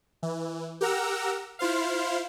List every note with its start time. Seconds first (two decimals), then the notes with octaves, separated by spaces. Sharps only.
0.23 E3
0.81 G4 A#4 F#5 A#5 E6
1.59 E4 F4 C5 F5